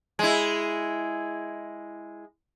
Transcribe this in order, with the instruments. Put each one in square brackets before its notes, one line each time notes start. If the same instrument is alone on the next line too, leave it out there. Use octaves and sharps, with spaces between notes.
[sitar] G#3 E4